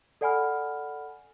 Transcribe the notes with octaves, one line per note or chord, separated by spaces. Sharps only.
A4 D5 F#5 G#5 B5 F6